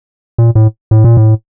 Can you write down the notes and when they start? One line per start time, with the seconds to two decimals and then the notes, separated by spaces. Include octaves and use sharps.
0.38 A#2
0.55 A2
0.91 A2
1.04 A#2
1.17 A2